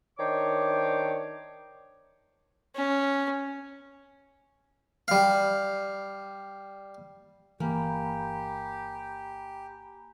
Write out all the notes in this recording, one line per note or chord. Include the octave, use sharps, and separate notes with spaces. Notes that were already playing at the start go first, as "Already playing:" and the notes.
D#3 D4 C5 C#5 D6
C#4
G3 F5
G1 E3 A#3 G4 G#5 A#5 B5